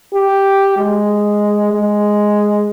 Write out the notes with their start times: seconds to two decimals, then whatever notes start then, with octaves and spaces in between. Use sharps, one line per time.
0.14 G4
0.77 G#3
1.72 G#3